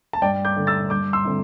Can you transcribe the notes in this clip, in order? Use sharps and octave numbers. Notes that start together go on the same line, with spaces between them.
A5
G2 D5 G5
D6 G6
D3 A3
E6 A6
G2 D6 G6
C6 E6
D3 C4 E4